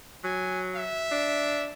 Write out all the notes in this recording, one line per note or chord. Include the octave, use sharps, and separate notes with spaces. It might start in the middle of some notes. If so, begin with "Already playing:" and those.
F#3 G#5
E5
D4